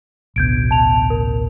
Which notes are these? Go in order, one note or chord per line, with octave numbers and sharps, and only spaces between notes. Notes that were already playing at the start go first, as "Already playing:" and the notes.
A1 D2 B2 G6 G#6 D7
A5 F7
A#4